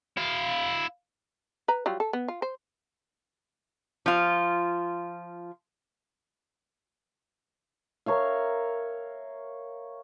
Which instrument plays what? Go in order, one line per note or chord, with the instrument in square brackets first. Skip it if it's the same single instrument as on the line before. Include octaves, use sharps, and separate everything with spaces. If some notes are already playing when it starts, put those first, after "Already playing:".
[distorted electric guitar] E4 F5
[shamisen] B4 A#5
F#3 G3 F4
A4
B3
F4
C5
[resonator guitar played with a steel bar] F3 F4
[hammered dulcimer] A#4 C#5 E5 F5